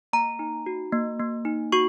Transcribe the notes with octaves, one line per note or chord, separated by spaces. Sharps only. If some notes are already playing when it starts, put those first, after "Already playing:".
A#3 A#5
D#4
F#4
A#3
A#3
D#4
F#4 C#6